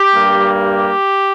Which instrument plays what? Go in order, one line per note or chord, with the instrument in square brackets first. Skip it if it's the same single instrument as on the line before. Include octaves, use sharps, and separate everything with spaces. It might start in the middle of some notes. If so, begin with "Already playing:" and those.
Already playing: [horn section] G4
G2 G3 A#3
G4